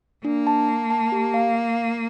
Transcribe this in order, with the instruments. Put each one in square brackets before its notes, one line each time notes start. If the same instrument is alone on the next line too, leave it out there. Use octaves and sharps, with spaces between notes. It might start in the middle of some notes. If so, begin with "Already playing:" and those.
[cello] A#3 [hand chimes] D4
[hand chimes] A5
A5
A5
G4
F5
F5